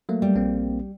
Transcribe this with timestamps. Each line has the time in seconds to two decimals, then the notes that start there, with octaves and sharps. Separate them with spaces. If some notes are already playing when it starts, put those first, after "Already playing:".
0.09 F#3 A3 A#3
0.22 G3
0.35 A#1 A#3 C4